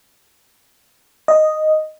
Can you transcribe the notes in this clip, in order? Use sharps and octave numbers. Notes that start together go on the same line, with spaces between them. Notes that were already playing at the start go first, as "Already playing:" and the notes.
D#5